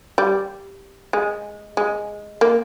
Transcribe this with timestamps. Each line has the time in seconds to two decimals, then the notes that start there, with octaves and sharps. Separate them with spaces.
0.18 G3
1.13 G#3
1.77 G#3
2.41 A#3